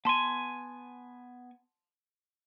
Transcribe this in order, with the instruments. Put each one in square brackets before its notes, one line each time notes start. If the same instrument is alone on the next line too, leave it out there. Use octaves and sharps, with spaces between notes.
[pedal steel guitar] B3 G#5 [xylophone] A5 C6